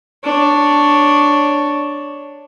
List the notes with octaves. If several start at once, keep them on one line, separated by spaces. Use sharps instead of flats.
D4 C#5